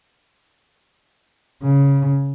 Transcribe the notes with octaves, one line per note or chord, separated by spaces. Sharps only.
C#3